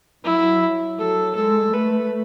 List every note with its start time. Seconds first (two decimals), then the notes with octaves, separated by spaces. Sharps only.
0.24 F#3 E4
0.98 F#3 A4
1.35 G#3 A4
1.72 A3 B4